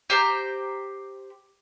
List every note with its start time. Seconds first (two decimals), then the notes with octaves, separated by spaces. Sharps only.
0.10 G4 C5 G5 A#5